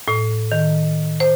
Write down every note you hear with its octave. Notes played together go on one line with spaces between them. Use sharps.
A2
D#3
C5